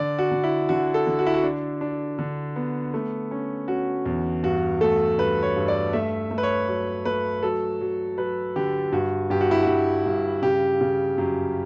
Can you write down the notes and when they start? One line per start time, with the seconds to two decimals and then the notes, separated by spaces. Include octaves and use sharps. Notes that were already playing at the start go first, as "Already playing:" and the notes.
Already playing: D3 D5
0.19 F#4
0.31 D3
0.44 E4
0.69 D3 F#4
0.94 A4
1.07 D3
1.19 F#4
1.26 E4
1.34 F#4
1.43 D4
1.81 D4
2.19 D3
2.56 B3
2.94 A3
3.31 C#4
3.68 C#4 F#4
4.06 E2
4.43 G2 F#4
4.81 A3 A4
5.18 G2 B4
5.43 C#5
5.56 G2
5.68 D5
5.93 A3 E5
6.31 A3
6.38 B4
6.43 C#5
6.68 F#3 C#5
7.05 A3 B4
7.43 F#3 A4
7.81 F#3
8.18 F#3 B4
8.56 D3 G4
8.92 G2 F#4
9.30 G2 G4
9.41 F#4
9.51 E4
9.63 G2 F#4
10.06 G2
10.42 C#3 G4
10.81 C#3
11.18 F#2